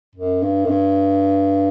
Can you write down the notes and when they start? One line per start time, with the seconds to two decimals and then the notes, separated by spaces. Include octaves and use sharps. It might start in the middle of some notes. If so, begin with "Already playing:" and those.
0.15 F#2
0.42 G2
0.65 F#2
0.70 G2